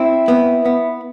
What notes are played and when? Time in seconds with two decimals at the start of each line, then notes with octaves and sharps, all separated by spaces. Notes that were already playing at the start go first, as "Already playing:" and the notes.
Already playing: C4 E4
0.28 B3
0.66 B3